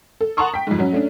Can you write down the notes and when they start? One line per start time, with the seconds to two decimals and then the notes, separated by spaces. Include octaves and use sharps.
0.21 A4
0.37 F#5 A5 A#5 C6 C#6 D#6
0.54 G5 B6
0.67 F2 G#2
0.79 F#3 C#4
0.92 A3 C#4 D4